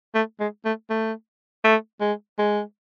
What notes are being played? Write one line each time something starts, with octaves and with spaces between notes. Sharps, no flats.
A3
G#3
A3
A3
A3
G#3
G#3